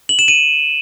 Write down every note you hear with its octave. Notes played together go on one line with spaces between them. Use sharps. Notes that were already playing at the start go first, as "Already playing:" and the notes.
F#7
E7
D#7